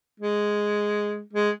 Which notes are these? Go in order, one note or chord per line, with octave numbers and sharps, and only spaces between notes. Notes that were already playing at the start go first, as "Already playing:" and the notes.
G#3
G#3